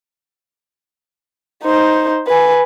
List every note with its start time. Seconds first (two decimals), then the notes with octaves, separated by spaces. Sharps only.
1.64 D#4 C5
2.27 B4 G#5